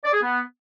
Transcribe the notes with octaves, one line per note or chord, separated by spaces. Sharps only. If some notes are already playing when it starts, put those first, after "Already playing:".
D5
G#4
B3